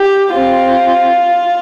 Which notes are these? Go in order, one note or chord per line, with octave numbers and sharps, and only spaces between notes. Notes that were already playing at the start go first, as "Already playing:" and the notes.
Already playing: G4
C4 F4